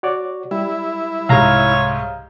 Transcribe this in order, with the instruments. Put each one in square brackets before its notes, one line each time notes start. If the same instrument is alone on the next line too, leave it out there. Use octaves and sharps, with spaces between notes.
[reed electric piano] F#4 C#5 D5
[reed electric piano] G3 [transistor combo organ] E4
[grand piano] C2 G#2 [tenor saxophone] C#5 [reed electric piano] F5 A#5 F6